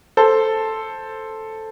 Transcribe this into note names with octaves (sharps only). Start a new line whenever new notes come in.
A4 C5